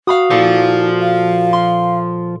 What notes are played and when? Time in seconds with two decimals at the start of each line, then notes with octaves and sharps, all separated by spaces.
0.07 F#4 F5 B5 D#6
0.31 A#2 F3 E4 A4
1.00 F5
1.53 C6